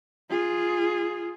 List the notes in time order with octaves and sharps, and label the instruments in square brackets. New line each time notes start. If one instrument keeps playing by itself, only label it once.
[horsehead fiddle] F4 G#4